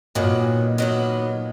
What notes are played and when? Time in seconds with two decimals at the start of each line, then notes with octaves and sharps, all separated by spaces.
0.15 A#2 D#3 F#3 B3
0.78 D#3 F#3 B3